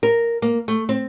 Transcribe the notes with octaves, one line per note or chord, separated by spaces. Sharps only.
A#4
A#3
A3
C4